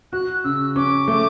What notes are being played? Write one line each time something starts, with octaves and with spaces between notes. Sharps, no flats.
F#4 F#6
C#3 E6
C#4 D6
A3